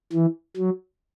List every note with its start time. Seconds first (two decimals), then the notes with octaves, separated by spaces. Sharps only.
0.12 E3
0.57 F#3